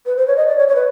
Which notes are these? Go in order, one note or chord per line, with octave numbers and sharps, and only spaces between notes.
B4
C5
C#5
D#5
D5
C#5
C#5
B4